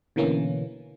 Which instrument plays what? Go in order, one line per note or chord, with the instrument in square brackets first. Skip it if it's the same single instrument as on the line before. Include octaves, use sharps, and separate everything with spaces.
[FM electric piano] B2 D3 E3 A#3 C#4